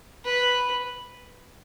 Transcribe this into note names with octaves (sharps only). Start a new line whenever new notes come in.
B4